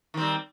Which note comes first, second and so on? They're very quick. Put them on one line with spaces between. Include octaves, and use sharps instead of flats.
D#3 C4 G3